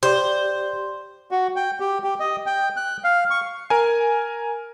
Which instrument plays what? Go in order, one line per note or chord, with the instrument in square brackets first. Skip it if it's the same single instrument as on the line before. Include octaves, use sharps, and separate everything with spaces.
[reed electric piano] G4 D5 [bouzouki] C5
[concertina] F#4
G5
G4
G4
D#5
G5
F#6
F5
C#6
[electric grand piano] A#4 G#5